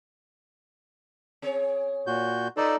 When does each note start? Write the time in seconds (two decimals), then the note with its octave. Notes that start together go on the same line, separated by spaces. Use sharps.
1.42 C4 G#4 C#5
2.07 A#2 F#4 G6
2.57 D#4 F4 A4 B4 C5 D5